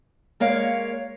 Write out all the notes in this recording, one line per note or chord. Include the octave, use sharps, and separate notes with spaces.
G#3 A#3 C#5 F5